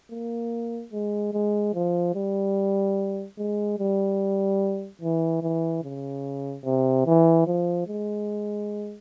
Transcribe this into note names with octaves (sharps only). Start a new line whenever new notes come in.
A#3
G#3
G#3
F3
G3
G#3
G3
E3
E3
C#3
C3
E3
F3
G#3